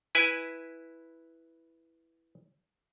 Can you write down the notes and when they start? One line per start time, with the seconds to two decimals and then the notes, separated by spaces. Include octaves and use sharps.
0.15 E4 B4 G#5